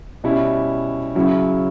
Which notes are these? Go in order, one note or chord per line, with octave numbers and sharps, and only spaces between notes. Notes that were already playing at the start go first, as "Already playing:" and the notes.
B2 G3 C#4 E4
C#3 F#3 C#4 E4